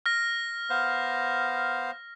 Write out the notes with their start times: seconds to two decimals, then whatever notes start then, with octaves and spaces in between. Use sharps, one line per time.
0.06 F6 A#6
0.70 B3 C5 F5